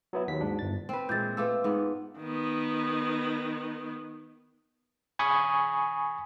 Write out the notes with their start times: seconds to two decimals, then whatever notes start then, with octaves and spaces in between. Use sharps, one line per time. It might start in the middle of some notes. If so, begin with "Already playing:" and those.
0.13 F#3 B3 E4
0.28 D#2 F#3 B6
0.41 G#2 D4
0.59 G1 A6
0.89 C4 B4
1.09 A#2 E3 G#3 G6 A6
1.37 A3 F4 A4 B4 D6 E6
1.64 G#2 B3
2.19 D#3 B3
5.19 G#5 B5 C#6 D#6